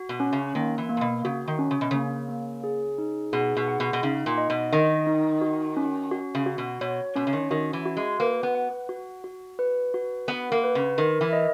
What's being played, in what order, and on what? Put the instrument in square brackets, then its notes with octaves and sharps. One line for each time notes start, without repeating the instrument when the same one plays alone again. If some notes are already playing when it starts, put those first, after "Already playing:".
Already playing: [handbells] F#4
[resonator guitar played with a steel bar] B2
[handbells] C#4
[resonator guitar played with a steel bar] C#3
[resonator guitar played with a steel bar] D#3 [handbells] A#3
[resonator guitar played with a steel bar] E3
[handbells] A#3
[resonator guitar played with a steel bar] A#2
B2
[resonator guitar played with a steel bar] C#3 [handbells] F#4
[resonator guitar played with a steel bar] D#3
[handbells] C#4
[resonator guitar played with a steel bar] C#3
B2
[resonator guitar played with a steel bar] C#3 [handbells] A#3
[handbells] A#3
G#4
D#4
[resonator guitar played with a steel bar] B2 [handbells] G#4
[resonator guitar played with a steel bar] B2
[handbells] F#5
[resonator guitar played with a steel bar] B2
B2
[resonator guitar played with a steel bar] C#3 [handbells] D#4
[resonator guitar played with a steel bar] A#2
[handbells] D#5
[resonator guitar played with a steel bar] B2
[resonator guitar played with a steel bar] D#3 [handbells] D#5
[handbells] D#4
F#4
C#4
F#4
[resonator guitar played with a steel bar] C#3
[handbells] F#4
[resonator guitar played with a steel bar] B2
[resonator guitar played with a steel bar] B2 [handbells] C#5
[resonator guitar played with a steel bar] B2 [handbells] C#4
[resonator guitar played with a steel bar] C#3
D#3
[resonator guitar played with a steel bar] D#3 [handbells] F#4
[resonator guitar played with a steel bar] E3
[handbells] F#4
[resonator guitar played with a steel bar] G#3
[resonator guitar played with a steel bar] A#3 [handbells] B4
[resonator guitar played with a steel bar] B3
[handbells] F#5
F#4
F#4
B4
F#4
[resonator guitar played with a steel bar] B3 [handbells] F#5
[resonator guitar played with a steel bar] A#3
[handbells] B4
[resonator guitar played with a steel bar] C#3
[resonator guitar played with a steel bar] D#3 [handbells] A#4
[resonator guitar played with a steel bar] E3
[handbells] D#5